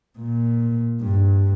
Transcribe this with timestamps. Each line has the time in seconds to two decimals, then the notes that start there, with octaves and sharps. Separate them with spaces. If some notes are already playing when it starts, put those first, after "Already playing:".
0.19 A#2
1.02 G2